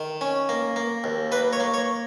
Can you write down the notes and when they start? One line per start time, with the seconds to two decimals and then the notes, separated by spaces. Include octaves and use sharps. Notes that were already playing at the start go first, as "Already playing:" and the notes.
Already playing: D#3
0.21 C#4
0.49 A#3
0.76 A#3
1.04 D#2
1.32 A#3 B4
1.53 C#5
1.60 A#3
1.74 C#5